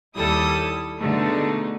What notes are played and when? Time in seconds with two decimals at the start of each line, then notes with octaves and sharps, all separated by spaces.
0.16 D#2 G3 E4 A4 D#6
0.99 B2 D3 G#3 A3 D#4